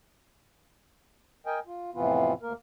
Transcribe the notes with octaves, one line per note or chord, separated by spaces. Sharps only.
A#4 D#5 G5 G#5
F4
F2 A2 C3 E3 B3 F4
D2 A#3 A#4